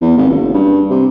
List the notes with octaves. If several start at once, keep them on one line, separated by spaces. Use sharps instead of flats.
E2
G#1
F#1
G2
C3